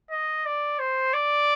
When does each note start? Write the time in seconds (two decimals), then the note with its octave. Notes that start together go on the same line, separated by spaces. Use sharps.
0.11 D#5
0.46 D5
0.79 C5
1.14 D5